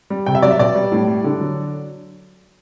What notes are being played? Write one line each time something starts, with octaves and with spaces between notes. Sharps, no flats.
G3
C3 G5
E5
F#3 D5
E5
B2 D5
G3
A2
G3
D3
F#3